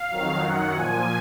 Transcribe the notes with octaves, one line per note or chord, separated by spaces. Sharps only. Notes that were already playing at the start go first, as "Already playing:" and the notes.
Already playing: F5
F2 D#3 F#3
F#2 D#3 F#3 F#5
A#2 F3 G#5